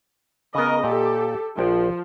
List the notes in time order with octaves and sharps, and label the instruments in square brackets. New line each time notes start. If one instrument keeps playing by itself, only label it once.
[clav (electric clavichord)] C#3 B3 [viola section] A#4 D#5
[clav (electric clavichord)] A#2 [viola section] G4 A4
[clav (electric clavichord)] A#1 G5 [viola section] F3